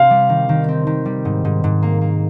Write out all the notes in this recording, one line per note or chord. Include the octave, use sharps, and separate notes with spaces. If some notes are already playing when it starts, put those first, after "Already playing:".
Already playing: C3 C4 F5
G3
D#3
D#3
C4
D#3
G3
G#2
G#2
G#2
A#3
A#3